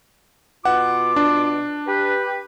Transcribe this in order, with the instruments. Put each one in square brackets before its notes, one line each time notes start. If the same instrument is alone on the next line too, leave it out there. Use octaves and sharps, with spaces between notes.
[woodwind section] B2 F4 D6 [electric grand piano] F#5
[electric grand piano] D4
[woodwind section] G4 B4